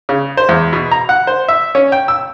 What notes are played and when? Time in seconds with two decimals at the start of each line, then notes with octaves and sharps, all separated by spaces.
0.09 C#3
0.37 C5
0.49 E2
0.73 B2
0.91 A#5
1.09 F#5
1.27 C5
1.48 E5
1.75 C#4
1.92 G5
2.08 E6